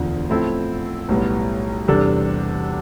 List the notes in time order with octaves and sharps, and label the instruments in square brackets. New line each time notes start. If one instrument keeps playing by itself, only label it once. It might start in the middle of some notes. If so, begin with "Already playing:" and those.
Already playing: [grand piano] E1 D2 D3 F3
A2 F3 C4 E4 A4
B1 A2 G3 B3
E2 C3 G3 D4 A4